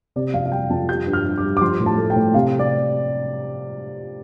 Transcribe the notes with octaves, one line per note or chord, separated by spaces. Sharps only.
C3 D5
F2 F5
F5
G3 G5
F2 A5
G3 G6
G2
F6
G2
D6
G3
D6
F3 C6
A2
A5
A3
G5
A2
C3 F5
D5